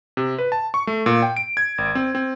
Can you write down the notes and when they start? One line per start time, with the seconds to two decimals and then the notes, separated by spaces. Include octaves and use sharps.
0.17 C3
0.38 B4
0.52 A5
0.74 C#6
0.87 A3
1.06 A#2
1.23 G5
1.37 D7
1.57 G#6
1.78 G#1
1.95 C4
2.15 C4